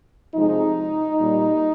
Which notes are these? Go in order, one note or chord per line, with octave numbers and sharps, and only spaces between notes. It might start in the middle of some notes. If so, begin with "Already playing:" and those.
C3 F3 G#3 D#4
A#2 G3